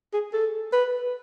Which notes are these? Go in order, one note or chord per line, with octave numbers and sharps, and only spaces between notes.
G#4
A4
B4